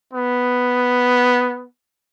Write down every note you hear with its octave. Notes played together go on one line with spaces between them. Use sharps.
B3